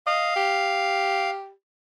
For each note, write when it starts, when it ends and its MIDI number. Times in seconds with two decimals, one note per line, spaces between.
0.07 0.31 75
0.07 1.31 77
0.36 1.52 67